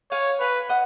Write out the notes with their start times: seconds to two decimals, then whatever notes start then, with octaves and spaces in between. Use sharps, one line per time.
0.12 C#5 F5 G#5
0.40 B4 F5 G#5
0.69 D#5 F#5